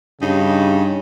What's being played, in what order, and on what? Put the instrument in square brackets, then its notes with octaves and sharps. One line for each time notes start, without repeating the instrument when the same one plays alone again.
[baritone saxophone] G2 [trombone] C#3 [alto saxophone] D#4